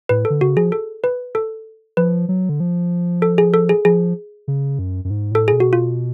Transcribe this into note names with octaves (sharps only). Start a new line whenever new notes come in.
A2 B4
A4
D3
C#3 F#4
F3 G#4
A4
B4
A4
F3 B4
F#3
D3
F3
A4
G#4
A4
G#4
F3 G#4
C#3
F#2
F#2
G#2
A2 A4
B2 G#4
F#4
F4